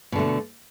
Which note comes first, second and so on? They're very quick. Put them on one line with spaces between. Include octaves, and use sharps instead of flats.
B2 D3 A3